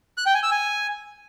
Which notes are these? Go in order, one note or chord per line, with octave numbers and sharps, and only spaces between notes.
F#6
G5
G#5
E6
G#5